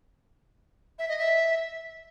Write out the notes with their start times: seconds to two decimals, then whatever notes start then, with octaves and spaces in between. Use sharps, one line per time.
0.99 E5
1.09 D#5
1.19 E5